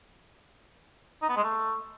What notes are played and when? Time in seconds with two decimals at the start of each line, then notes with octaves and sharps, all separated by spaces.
1.22 D#4
1.29 B3
1.36 G#3
1.44 A3